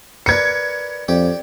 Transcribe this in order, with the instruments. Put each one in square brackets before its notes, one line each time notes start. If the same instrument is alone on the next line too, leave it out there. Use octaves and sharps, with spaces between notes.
[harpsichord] A#4 B4 D5 [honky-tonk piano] G#6 C#7
[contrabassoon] F2 [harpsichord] G4 D5